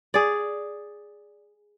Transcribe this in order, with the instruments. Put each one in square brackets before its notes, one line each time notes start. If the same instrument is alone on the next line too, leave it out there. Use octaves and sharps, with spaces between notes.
[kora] G#4 D5